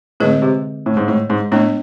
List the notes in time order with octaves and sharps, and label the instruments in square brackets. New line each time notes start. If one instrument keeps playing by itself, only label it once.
[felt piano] A2 [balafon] D3 G#3 C4 G#4 B4
[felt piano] C3
A2
G#2
A2
G#2
[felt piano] A2 [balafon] G#3 B3 D4